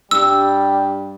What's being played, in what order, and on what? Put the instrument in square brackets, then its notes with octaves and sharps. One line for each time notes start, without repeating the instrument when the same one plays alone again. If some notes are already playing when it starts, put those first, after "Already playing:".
[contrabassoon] G2 [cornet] G3 [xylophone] E6